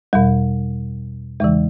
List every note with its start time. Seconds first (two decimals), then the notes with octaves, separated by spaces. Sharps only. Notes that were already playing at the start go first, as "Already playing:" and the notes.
0.13 E2 B2 G3
1.40 E2 C#3 E3 G#3